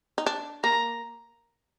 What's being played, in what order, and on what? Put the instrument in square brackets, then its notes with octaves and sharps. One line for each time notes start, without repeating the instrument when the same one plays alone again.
[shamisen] D#4
D4
[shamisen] A#3 [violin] A#5